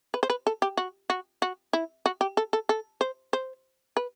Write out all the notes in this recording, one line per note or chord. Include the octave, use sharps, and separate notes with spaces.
B4
C5
B4
A4
G4
F#4
F#4
F#4
E4
F#4
G4
A4
A4
A4
C5
C5
B4